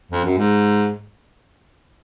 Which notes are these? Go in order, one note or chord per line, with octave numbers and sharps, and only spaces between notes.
F2
F#2
G#2